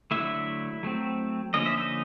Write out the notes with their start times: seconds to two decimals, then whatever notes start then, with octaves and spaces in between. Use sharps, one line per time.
0.11 D3 F#3 A3 E4 E5
0.83 F#3 A3 C4
1.54 D3 F3 A#3 C#4 D#5
1.66 E5
1.78 D#4 D#5